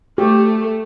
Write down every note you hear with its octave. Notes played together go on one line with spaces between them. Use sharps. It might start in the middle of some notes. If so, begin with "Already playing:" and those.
A3 G4